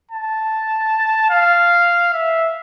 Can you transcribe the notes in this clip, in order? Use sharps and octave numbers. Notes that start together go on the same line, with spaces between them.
A5
F5
E5